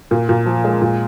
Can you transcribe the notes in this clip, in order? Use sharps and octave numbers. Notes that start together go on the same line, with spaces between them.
A#2
A#2
F3
G#3
A#2